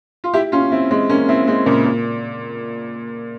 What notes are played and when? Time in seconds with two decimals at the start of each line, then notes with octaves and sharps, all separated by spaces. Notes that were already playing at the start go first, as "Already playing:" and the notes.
0.24 F4
0.34 E4 G4
0.52 C#4 F4
0.72 C4 E4
0.91 G#3 C4
1.09 A#3 C#4
1.29 C4 E4
1.47 G#3 C4
1.66 A#2 C#3
1.85 A#2